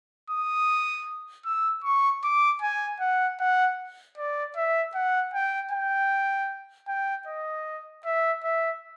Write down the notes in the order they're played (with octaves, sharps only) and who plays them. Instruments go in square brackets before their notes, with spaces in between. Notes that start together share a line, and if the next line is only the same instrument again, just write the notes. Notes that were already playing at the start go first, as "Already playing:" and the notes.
[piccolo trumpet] D#6
E6
C#6
D6
G#5
F#5
F#5
D5
E5
F#5
G5
G5
G5
D#5
E5
E5